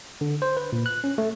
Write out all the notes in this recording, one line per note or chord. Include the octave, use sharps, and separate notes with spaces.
D3
C5
B4
A#2
F#6
C#4
A3